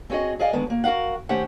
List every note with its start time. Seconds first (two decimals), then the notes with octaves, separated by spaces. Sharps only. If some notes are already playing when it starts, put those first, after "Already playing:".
0.10 C4 C#4 F#4 G#4 D#5
0.39 G#4 D5 D#5 F5 G#5
0.53 D3 D#3 G#3 B3
0.67 D2 A#3
0.84 F#4 A4 A#4 F5 F#5
1.29 D#3 A3 C#4 G4 C5 F#5